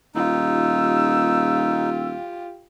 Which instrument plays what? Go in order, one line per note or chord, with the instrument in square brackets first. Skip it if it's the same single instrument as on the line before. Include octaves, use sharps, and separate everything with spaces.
[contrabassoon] D#1 [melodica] D#4 [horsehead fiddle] F4 G4 [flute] E6